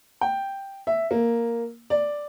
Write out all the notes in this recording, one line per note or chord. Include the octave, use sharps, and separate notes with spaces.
G5
E5
A#3
D5